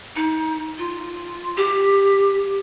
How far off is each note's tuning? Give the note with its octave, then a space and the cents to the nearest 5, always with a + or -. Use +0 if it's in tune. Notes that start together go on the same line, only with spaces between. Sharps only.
D#4 +25
F4 -5
G4 +10